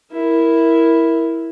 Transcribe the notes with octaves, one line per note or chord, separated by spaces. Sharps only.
E4 A#4